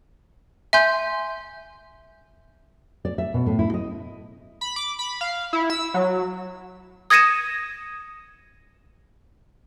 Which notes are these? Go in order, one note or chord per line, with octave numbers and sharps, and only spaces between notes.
E5 G#5 C6 G6
D5
E5
B2
A2
E4
D#5
B5
D6
B5
F5
E4
E6
F#3
D#6 G#6 A#6 C#7 D#7 E7